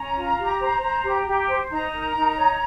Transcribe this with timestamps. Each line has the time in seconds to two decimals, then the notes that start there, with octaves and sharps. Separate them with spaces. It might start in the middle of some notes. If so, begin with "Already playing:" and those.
Already playing: C#4 A#5
0.15 F4
0.38 G4
0.60 C5
0.81 C5
1.04 G4
1.27 G4
1.48 C5
1.71 D#4 A#5
1.93 A#4
2.16 D#4
2.37 C#5